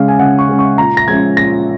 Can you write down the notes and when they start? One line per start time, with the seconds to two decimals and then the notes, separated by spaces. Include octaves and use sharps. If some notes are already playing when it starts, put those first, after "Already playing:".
Already playing: C#3 G#3 C#4 F5
0.08 G#5
0.19 C#3 F#5
0.39 C#6
0.49 G#3 C#4
0.59 C#6
0.78 A#2 A#5
0.97 A#6
1.07 F3 G#3 C#4 G#6
1.37 A#2 A#6